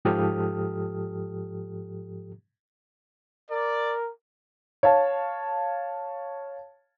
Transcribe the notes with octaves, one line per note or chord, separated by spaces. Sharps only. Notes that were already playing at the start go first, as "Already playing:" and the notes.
G#2 F3 G4 A4 D#6 F6
A#4 D5
C#5 F5 A5